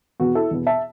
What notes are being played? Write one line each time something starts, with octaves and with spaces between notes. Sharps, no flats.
E2 B2 B3 F#4
E4 A4
E2 B2 B3
E5 A5